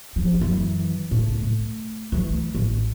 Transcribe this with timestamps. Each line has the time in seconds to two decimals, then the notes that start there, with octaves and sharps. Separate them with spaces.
0.16 F3
0.41 F#2 E3
1.11 A2 C#3
1.42 A3
2.12 E3 A3
2.55 A1